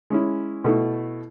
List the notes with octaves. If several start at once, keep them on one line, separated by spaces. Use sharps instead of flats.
G#3 C#4 E4
B2 A3 E4